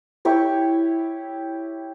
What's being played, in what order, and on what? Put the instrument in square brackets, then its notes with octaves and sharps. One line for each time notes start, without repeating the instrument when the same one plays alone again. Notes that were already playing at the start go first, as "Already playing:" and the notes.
[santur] E4 G4 C#5